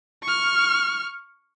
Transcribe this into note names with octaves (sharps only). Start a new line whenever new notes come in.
C#6 F6